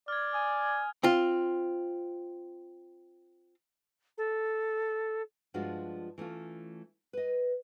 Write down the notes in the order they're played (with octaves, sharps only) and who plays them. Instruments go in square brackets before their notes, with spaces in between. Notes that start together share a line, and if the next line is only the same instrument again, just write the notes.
[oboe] D5 [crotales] F6 G#6
[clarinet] G#5 [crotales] D#6
[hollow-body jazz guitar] C4 F4
[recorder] A4
[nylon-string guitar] G2 F3 G#3 D4 F4 F#4
E3 A3 C#4 F4
B4 D#5